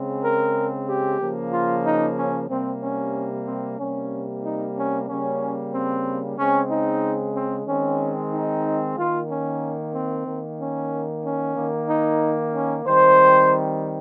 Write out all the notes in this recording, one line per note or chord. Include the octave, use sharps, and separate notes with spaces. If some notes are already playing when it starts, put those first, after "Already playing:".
Already playing: C#3 G#3 C4
A#4
G4
C#3 F3 A#3
F4
D#4
C#4
C3 G3 A#3 C4
C#4
C4
C3 G3 A#3 C#4
D#4
C#4
C#3 G3 A#3 C#4
C4
C#3 G#3 C4 C#4
D#4
C4
D#3 G#3 C4 C#4
D#4
D#3 A#3 F4
C#4
C4
D#3 A#3
C#4
C#4
D#3 A#3
D#4
C#4
D#3 G3 C4 C5